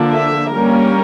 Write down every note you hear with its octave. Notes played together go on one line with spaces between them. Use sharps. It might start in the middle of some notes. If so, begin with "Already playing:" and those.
Already playing: D3 F3 A#3 D4
E5
G3 A#3 C#4 A#4